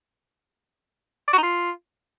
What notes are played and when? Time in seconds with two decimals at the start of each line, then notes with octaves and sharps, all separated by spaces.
1.28 D5
1.33 F#4
1.38 D#4
1.43 F4